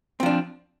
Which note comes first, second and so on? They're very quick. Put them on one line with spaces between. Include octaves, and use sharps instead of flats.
C4 F3 D4